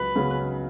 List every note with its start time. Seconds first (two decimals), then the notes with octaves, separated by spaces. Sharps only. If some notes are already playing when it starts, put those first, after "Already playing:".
Already playing: C#2 F#3 B4
0.16 C#3 F#3 C#4